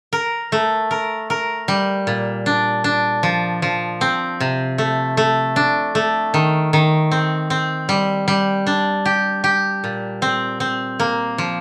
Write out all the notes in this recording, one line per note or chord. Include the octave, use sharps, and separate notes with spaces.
A#4
A3
A#4
A#4
G3
A#2
D4
D4
F3
F3
C4
C3
A3
A3
D4
A3
D#3
D#3
C4
C4
G3
G3
D4
G4
G4
A#2
C4
C4
A#3
F3